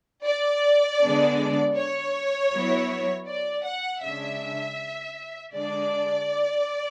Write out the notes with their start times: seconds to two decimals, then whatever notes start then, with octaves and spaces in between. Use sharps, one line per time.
0.24 D5
1.01 D3 G#3 B3 D4
1.76 C#5
2.52 F#3 B3 E4
3.28 D5
3.65 F#5
4.03 C#3 G#3 D4 E5
5.54 D3 G#3 D4 D5